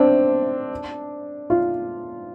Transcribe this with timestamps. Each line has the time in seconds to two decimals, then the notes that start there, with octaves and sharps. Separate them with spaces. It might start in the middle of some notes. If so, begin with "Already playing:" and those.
Already playing: C4 D4
1.50 F4